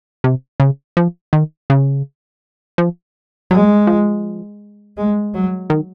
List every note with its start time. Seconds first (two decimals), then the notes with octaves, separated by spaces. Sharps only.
0.24 C3
0.60 C#3
0.97 F3
1.33 D#3
1.70 C#3
2.78 F3
3.51 F#3 G#3
3.87 F3
4.97 G#3
5.34 F#3
5.70 D#3